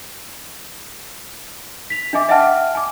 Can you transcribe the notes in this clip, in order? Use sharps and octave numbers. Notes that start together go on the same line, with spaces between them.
B6 F7
D4 D#5 E5 G#5 D6
D#5 E5 F#5 G5 A5 F6
G#5 D6